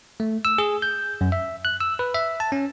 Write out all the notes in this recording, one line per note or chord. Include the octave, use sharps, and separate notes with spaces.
A3
E6
G#4
G6
F#2
E5
F#6
E6
B4
E5
A5
C#4